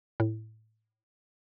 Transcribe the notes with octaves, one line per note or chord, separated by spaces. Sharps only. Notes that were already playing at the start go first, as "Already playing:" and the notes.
A2